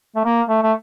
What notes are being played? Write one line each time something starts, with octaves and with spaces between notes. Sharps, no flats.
A3
A#3
A3
A3